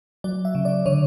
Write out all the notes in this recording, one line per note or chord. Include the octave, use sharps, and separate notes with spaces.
F#3 D5
E5
C#3
D5
D3 C#5